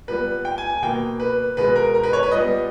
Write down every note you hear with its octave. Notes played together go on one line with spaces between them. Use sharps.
A#2 G3 B3 B4
G5
G#5
G#5
B2 A#3 G5
B4
B2 G#3 B3 B4
A#4
A#4
B4
C#5
B4
A#2 G3 B3 D#5